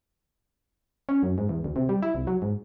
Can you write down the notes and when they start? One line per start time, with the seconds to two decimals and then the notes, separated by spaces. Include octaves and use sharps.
1.09 C#4
1.23 F#2
1.38 G#2
1.49 E2
1.64 D2
1.76 C3
1.89 G3
2.02 E4
2.15 C2
2.27 F#3
2.42 G#2